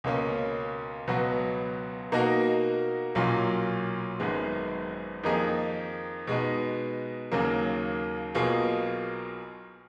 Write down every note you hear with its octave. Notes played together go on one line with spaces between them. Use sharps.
C#2 B2 A#3 C#4
C#2 B2 F#3 B3 F#4
B2 A#3 D#4 F#4 A#4
B1 A#2 F#3 C#4 F4
G#1 F#2 D#3 G#3 B3
F2 D#3 A#3 D#4 G#4
B2 G#3 B3 D#4
D#2 C#3 F#3 A#3
B1 B2 A#3 F4 G#4